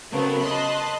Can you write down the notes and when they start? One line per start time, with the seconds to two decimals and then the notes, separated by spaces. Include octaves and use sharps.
0.12 C#3 F#3 A3 B3 C4 A#4
0.40 D#5 A5 B5 C6 F#6